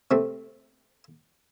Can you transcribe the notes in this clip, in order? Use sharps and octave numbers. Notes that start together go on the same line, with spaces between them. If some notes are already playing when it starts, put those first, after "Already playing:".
C3 A3 C4